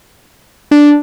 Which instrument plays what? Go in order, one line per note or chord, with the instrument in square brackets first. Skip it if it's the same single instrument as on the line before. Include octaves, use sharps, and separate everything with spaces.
[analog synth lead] D4